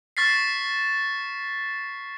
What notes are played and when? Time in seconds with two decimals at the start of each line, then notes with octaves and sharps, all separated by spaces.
0.17 C#6 F6 A6 B6 C7